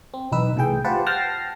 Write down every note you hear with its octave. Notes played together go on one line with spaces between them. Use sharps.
C4
B1 E2 D#4 B4 E6
C2 A2 E3 G#4 G5
F4 G4 B4 C5 F#5 A5
F#5 G5 A5 F6 A#6 C7